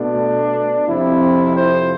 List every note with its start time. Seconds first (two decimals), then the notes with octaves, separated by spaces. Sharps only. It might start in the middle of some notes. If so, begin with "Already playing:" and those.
Already playing: B2 A3 D4
0.88 F2 C3 F3 E4
1.56 C5